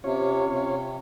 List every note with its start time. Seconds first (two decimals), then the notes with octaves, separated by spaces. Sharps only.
0.04 C3 C#4 F4 C#5
0.52 C3